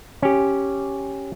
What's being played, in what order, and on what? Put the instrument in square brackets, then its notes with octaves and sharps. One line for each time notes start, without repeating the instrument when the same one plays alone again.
[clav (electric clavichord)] C#4 G4